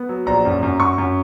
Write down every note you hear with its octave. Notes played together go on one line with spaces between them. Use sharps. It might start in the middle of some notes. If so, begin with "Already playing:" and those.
Already playing: B3
F#3
A#1 A#5
F#2
F#2
F#2 C#6
F#2